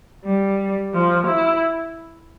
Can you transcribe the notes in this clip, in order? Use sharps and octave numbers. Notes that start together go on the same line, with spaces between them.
G3
F3
E4